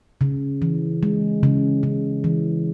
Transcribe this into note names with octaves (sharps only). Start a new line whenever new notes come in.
C#3
E3
G#3
C#3
C#3
E3